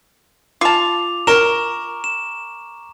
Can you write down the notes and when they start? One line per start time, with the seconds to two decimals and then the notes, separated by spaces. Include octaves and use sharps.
0.61 F4 A5 D6 F7
1.27 A#4 A#5 C#6 E7
2.04 E7